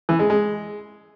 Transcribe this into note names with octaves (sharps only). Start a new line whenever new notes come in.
E3
G#3
G#3